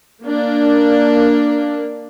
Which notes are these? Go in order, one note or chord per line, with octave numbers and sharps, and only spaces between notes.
A#3 D4